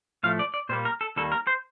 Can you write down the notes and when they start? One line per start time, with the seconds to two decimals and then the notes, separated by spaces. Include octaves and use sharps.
0.23 A2 F3 A3 F5
0.39 D5
0.54 D5
0.69 A#2 G3 A#3 C5
0.85 A#4
1.01 A4
1.16 D#2 D#3 G3 A#3 A4
1.32 A#4
1.47 C5